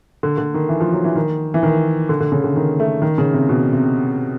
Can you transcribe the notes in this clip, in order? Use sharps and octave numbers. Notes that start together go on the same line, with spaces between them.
D3
D3
D#3
E3
F3
F#3
E3
D#3
E3
D#3
D3
D3
C#3
D3
D#3
A3
D#3
C#3
C3
B2
C3